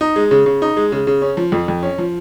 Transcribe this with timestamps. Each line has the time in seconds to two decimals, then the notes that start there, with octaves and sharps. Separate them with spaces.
0.01 D#4
0.16 G#3
0.31 C#3
0.46 C#3
0.62 D#4
0.77 G#3
0.92 C#3
1.07 C#3
1.22 C#4
1.37 F3
1.52 F2
1.68 F2
1.83 C#4
1.98 F3